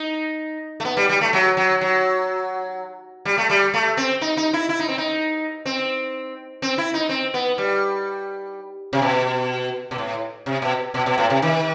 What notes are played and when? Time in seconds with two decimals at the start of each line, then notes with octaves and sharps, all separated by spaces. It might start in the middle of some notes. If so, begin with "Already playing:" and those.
Already playing: D#4
0.80 A3
0.85 B3
0.97 G3
1.09 G3
1.21 A3
1.33 F#3
1.57 F#3
1.81 F#3
3.25 G3
3.37 A3
3.50 G3
3.74 A3
3.97 C4
4.21 D#4
4.37 D#4
4.53 E4
4.69 E4
4.79 D#4
4.88 C4
4.98 D#4
5.66 C4
6.62 C4
6.78 E4
6.94 D#4
7.09 C4
7.34 B3
7.58 G3
8.93 C3
9.02 B2
9.91 B2
9.98 A2
10.46 C3
10.62 B2
10.94 B2
11.06 B2
11.18 A2
11.30 C3
11.42 D#3